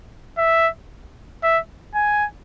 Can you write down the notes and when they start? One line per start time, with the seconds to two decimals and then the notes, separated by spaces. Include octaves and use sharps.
0.38 E5
1.43 E5
1.95 G#5